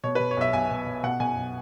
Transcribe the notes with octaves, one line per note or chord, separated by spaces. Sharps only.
B2 C#5
B4
B2
C#5
B1 E5
B1 G#5
B2
B2
B2 F#5
B2 G#5
B1